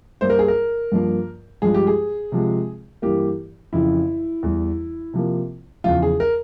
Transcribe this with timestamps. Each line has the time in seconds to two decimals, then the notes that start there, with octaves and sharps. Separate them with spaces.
0.21 G2 G3 A#3 C5
0.30 A#4
0.39 G#4
0.48 A#4
0.92 G2 F3 A#3
1.62 G2 F3 G#3 G#4
1.74 G4
1.87 G#4
2.32 C3 F3 G#3
3.02 G2 E3 A#3 G4
3.73 F2 C#3 E3 E4
4.43 E2 E3 G3
5.14 C3 F3 A#3
5.84 E2 C#3 F3 F4
6.02 G#4
6.20 A#4